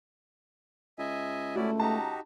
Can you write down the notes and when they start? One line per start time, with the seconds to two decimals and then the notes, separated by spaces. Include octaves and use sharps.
0.99 C#2 D#5 E5 G#5
1.56 A3 C#4 E4 F#4 D5
1.80 D#4 F#4 G4 A5 A#5